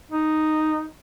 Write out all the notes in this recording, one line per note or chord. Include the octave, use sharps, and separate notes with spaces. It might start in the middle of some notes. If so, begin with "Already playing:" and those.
D#4